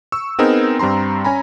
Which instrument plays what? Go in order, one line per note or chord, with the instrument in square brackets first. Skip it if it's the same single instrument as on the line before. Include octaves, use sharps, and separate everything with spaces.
[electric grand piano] C#6 E6
B3 C4 D#4 G#4 A#4
G2 G3 C4 A#5 C6
C#4 G#5 A#5 B5